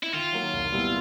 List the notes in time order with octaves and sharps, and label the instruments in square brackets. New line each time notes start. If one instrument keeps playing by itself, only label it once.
[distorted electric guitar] E4
[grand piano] D#3 [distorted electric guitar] F4
[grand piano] F#3 A#3
C2
A#2 G3 B3 E4